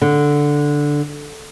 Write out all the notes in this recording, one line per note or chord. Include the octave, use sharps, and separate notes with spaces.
D3